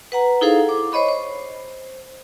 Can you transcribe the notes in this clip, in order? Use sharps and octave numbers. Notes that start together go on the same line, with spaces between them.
B4 F#5 A#5
D#4 E4 G#4 A4 C5 F5
D6
C5 C#5 D#5 B5 C#6
C5